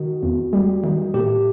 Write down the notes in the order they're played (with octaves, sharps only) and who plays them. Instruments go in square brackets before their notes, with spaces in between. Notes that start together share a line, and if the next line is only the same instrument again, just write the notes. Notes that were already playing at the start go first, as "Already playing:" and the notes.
Already playing: [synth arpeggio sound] D#3 [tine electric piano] F#4
[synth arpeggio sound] E2
G3
D#3
[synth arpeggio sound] A2 [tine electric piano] G4